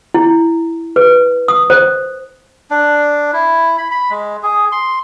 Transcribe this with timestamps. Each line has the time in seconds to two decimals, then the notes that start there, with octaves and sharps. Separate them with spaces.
0.14 E4
0.96 B4
1.48 D#6
1.70 C5
2.70 D4
3.33 E4
3.78 B5
3.91 B5
4.10 G#3
4.43 G#4
4.72 C6